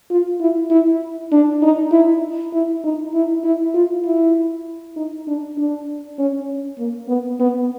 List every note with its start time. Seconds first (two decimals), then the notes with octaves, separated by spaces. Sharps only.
0.11 F4
0.41 E4
0.71 E4
1.32 D4
1.63 D#4
1.92 E4
2.53 E4
2.84 D#4
3.14 E4
3.44 E4
3.74 F4
4.05 E4
4.97 D#4
5.27 D4
5.58 D4
6.18 C#4
6.78 A#3
7.08 B3
7.40 B3